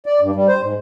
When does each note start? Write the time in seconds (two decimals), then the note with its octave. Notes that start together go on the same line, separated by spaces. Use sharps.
0.06 D5
0.21 G2
0.35 G3
0.48 C5
0.63 G#2